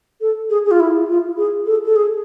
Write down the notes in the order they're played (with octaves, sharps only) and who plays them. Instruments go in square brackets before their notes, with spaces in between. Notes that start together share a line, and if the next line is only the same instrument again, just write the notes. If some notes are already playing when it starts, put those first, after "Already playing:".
[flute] A4
G#4
G#4
F4
E4
F4
G#4
A4
A4
G#4